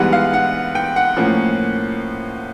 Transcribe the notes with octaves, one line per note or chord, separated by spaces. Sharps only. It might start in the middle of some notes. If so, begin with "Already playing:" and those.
Already playing: G#2 E3 G3 B3 F#5
F5
F#5
G5
F#5
A2 F3 A#3 C#4